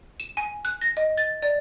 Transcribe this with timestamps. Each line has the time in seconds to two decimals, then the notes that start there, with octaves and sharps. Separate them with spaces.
0.20 E7
0.37 G#5
0.65 F#6
0.81 A#6
0.97 D#5
1.17 A6
1.42 D5